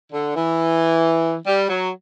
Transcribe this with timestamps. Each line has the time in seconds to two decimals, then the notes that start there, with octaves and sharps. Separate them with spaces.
0.13 D3
0.35 E3
1.47 G3
1.68 F#3